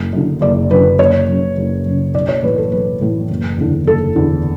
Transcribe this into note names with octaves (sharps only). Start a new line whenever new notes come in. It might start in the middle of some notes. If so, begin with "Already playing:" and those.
Already playing: F#1
F#2 D3
F#1 D5
F#2 D3 B4
F#1 C#5
F#2 C#3
F#1
F#2 C#3
B1 D5
C#5
A2 E3 B4
A4
B1 B4
A2 E3
F#1
E2 D3
F#1 A4
E2 D3